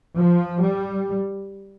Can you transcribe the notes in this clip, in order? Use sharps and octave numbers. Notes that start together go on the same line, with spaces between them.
F3
G3